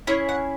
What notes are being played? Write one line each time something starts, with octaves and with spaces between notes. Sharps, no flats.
C#4 E4 G#4 C#5
F#5